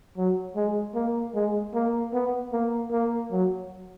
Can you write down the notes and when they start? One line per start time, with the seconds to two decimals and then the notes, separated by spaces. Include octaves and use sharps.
0.17 F#3
0.56 G#3
0.95 A#3
1.35 G#3
1.74 A#3
2.13 B3
2.53 A#3
2.92 A#3
3.31 F#3